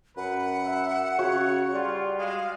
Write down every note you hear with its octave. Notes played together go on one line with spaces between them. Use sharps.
F#2 B4 F#5
E5
C#3 F#4 C#5
G3 F4
G#3 F5